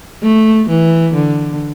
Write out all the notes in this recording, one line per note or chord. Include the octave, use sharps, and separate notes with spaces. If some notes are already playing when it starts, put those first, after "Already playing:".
A3
E3
D3